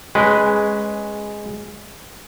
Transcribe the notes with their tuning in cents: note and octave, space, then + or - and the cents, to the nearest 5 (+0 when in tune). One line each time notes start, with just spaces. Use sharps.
G#3 +0 C#4 -20 B4 +0